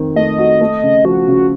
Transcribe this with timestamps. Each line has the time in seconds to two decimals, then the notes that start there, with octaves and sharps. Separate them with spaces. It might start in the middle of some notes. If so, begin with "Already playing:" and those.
Already playing: F2 D#3 C4
0.16 A3 D#5
0.38 F#4
0.61 A3
0.83 C#3
1.05 F3 F#4
1.28 C#3